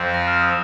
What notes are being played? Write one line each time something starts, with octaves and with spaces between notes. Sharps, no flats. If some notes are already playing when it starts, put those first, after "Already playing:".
Already playing: F2 F3 C4
A#6
F6
D#6